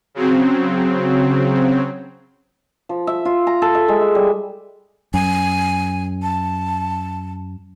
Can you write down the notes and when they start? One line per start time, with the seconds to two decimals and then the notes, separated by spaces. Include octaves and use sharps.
0.14 C#3 F#3 C4
2.89 F3
3.07 E5
3.25 F4
3.47 A#5
3.62 A4
3.75 E5
3.88 G#3
4.01 E5
4.15 G3
5.14 F#2 G#5
6.22 A5